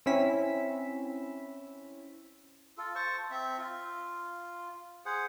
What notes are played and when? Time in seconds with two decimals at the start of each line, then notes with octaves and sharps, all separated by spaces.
0.06 C4 C#4 E4 E6 B6
2.78 F4 A4
2.95 C5 A5 C#6
3.31 C4 E5
3.58 F4
5.06 G#4 C5 F#5